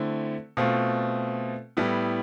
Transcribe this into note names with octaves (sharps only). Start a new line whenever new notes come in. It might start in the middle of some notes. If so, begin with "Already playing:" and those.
Already playing: D3 A3 C4 E4
B2 A3 C4 F4
A2 G3 B3 E4